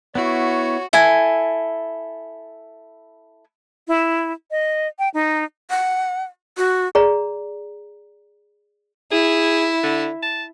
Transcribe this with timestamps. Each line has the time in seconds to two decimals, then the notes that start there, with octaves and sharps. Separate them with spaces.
0.15 B3 E4 F#4 C#5
0.93 E4 A4 G#5
3.88 E4
4.51 D#5
4.99 G5
5.14 D#4
5.70 F#5
6.57 F#4
6.95 G#4 D5 A#5
9.12 E4 G#4
9.83 D3
10.23 A5